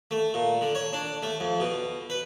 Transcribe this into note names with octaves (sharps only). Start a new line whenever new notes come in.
A3
A#2
D3
C#5
D4
A3
F2
B2
B4